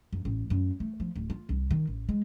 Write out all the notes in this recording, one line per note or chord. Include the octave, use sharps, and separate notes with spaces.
F#2
A1
F#2
A3
F3
D1
F4
C2
D#3
A1
G#3